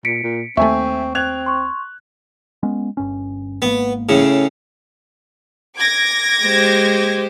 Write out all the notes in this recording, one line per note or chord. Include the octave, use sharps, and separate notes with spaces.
A#2 B6 C#7 D7
A#2
D#2 A3 C4 E5 G#5 C#6
C4 F#6 G#6 F7
C6 C#6
G#3 B3 C#4
G1 G2 C#4
G#1 G#2 A#3 B3
A2 C#3
D6 G#6 A#6
G#3 G4 C5